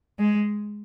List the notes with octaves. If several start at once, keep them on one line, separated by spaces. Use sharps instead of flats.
G#3